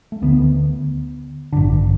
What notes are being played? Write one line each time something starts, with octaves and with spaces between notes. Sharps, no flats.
A3
D2 D3 B3
A1 G2 D3 D4